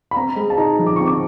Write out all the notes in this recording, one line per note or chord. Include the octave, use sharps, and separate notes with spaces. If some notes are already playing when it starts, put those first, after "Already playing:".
B5
C4 A#5
G#3
A5
D#4 A#5
F3
D6
C4 C#6
D6